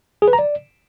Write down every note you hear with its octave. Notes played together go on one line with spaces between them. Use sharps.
G#4
B4
A#5
D5